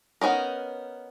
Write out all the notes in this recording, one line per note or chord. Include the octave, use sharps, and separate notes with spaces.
B3 C#4 D#4 A#4